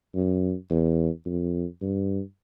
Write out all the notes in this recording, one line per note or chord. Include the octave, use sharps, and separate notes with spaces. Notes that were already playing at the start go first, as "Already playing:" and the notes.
F#2
E2
F2
G2